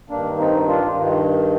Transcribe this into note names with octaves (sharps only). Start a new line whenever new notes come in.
G2 D#3 A#3 D4
C4 D#4
D4 F4
G2 D#3